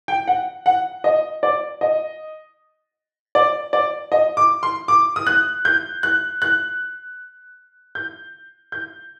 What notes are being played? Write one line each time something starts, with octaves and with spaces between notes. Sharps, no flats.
G5
F#5
F#5
D#5
D5
D#5
D5
D5
D#5
D6
C6
D6
D#6
F#6
G6
F#6
F#6
G6
G6